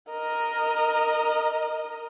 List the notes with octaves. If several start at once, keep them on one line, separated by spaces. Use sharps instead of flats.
A#4 D#5